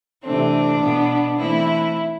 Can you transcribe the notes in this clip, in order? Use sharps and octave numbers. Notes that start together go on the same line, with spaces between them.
C3 E3 A3 C4 D4
B2 B3
E3 A3 C4 E4